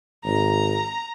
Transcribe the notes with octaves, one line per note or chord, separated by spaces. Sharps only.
G#1 A#5